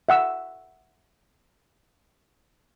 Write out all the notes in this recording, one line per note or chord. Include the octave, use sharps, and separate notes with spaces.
E5 F#5 E6